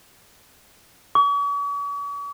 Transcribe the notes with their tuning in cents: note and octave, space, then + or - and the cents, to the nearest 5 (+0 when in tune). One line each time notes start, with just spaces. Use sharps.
C#6 +45